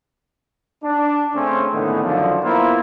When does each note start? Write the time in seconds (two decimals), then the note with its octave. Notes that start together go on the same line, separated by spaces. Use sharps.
0.84 D4
1.34 C#3 A3 C4 C#4
1.72 A2 D3 D#3 G#3 A3 B3
2.03 F#2 D3 D#3 F3
2.43 A#3 B3 E4 F4 A#4 C5